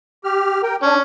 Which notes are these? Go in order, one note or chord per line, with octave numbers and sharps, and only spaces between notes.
G4 F6
A#4 G5
C#4 D4